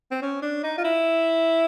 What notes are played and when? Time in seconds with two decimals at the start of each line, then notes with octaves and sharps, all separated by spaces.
0.11 C4
0.22 C#4
0.42 D4
0.63 D#4
0.78 F4
0.84 E4